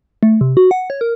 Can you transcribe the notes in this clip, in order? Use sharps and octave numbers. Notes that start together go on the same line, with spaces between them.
A3
C3
F#4
F#5
C#5
A#4